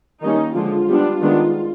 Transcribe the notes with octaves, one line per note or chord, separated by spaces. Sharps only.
D#3 G3 A#3 C#4 D#4
D3 F3 G#3 F4
G3 B3 D4
D#3 G#3 B3 D4